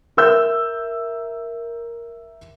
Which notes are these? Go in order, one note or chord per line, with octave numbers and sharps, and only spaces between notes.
A#4 E5 E6 G6